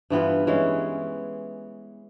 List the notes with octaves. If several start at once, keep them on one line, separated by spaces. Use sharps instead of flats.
G2 E3 B3 F4
E3 G#3 C#4